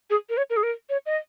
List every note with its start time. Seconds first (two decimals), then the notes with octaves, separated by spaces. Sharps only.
0.10 G#4
0.29 A#4
0.37 C#5
0.50 A#4
0.57 G#4
0.63 A#4
0.89 C#5
1.06 D#5